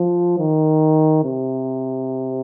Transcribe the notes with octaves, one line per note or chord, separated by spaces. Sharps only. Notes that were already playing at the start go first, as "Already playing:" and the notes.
Already playing: F3
D#3
C3